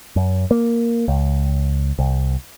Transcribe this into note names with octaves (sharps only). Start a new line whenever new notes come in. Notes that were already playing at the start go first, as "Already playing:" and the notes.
F#2
A#3
C#2
C2